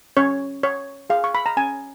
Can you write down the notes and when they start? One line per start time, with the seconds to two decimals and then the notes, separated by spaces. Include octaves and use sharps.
0.17 C#4 C#5
0.63 C#5
1.10 G#4 F5
1.24 C#6
1.35 B5
1.46 A#5
1.57 C#4 G#5